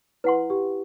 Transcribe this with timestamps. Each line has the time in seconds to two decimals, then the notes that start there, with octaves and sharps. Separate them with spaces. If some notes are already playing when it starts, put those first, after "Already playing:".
0.24 E4 B4 F#5 C6
0.50 G4